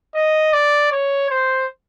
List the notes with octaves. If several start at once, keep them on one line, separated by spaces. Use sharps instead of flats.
D#5
D5
C#5
C5